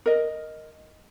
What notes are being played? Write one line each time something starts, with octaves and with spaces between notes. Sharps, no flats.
A#4 D#5